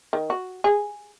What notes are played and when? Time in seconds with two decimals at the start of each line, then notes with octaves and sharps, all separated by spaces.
0.13 D#3
0.30 F#4
0.64 G#4